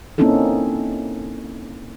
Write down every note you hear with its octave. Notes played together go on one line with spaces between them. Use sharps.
A#3 C4 C#4 D#4 E4 A4